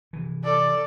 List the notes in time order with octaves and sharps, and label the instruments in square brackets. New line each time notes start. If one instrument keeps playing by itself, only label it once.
[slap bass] C3 E3
[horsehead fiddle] A4 D5